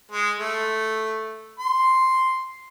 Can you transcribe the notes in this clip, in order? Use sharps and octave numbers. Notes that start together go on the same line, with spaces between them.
G#3
A3
C6